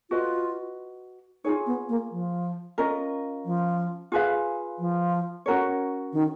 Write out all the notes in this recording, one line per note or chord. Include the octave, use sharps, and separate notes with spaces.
F4 F#4 B4 D#5
D#4 F4 G#4 C#5
B3
A#3
F3
C#4 F4 A#4 D#5
F3
F4 G#4 B4 F5
F3
C#4 F#4 A#4 C#5
D#3